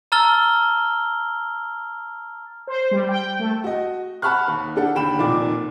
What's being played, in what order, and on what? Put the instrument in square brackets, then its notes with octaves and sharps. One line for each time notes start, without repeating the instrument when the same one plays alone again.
[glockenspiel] A5 A#5 E6 F6 A6 G7
[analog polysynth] C5
G3
G5
A3
[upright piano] F#4 D#5
F#5 A5 B5 C#6 F6 F#6
D#2
D4 G4 A4 F#5
D#2 D3 G5 B5 E7
F1 A#2 D#4 D5 D6